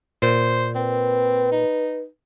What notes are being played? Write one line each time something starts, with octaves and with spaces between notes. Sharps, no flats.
A#2 C5
C4 B4
D#4